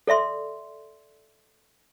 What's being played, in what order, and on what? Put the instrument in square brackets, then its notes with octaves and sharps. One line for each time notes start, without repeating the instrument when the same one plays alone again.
[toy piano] A4 D5 E5 C6